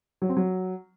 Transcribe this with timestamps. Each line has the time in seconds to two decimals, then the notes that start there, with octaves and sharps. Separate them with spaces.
0.22 F#3
0.29 C4
0.37 F#3